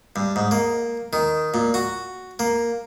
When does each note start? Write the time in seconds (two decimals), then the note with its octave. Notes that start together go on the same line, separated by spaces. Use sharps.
0.16 G2
0.36 G#2
0.51 A#3
1.13 D#3
1.54 A#2
1.74 F#4
2.39 A#3